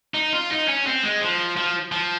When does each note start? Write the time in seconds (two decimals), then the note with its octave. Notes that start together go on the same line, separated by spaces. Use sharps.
0.14 D#4
0.33 F4
0.50 D#4
0.68 C#4
0.86 C4
1.03 G#3
1.21 F3
1.56 F3
1.92 F3